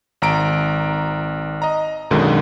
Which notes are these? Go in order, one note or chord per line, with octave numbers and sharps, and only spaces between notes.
G#1 A#5 D7
D#5 A#5
B1 F#2 D3 D#3 G#3